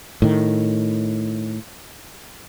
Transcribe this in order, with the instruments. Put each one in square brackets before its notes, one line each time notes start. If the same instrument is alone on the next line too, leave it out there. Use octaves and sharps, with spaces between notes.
[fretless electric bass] A2 D#3